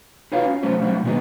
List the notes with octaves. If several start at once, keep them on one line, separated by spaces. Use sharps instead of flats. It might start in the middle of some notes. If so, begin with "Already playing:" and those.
D#4 F4 F#4 B4 C#5 F5
C#4
F#3 A3 C#4 G4 C5
F#3 G3 A3 C4 D4 E4
A#2 D#3 F#3 G#3 B3 D#4